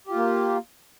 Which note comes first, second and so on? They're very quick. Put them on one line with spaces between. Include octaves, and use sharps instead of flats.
G4 F4 A#3